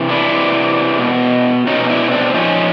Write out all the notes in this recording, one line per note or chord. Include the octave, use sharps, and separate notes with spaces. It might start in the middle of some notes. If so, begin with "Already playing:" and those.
Already playing: C3 E3
D4 E4
C3 E3
B2
B2 C#4 D#4
D4 E4
C#4
C4 D4
A#2 F3 C#4 D#4